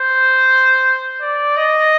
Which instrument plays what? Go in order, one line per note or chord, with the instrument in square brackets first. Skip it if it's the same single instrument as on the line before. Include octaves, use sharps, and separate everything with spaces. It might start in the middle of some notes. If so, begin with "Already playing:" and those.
Already playing: [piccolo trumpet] C5
D5
D#5